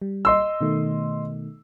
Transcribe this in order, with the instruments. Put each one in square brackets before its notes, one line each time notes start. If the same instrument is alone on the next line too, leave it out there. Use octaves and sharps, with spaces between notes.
[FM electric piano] G3
[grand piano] D#5 C6 E6
[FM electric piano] B2 D#3 A3